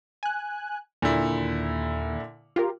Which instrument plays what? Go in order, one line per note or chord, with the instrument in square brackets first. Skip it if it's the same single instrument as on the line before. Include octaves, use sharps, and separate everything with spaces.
[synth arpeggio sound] G#5 F#6
[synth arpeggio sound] D#2 [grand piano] A#2 D3 E4
[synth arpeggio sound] F4 G4 A#4